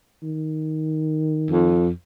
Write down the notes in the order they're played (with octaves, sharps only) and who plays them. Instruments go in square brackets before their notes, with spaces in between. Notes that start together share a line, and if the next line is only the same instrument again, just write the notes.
[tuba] D#3
[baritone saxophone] F2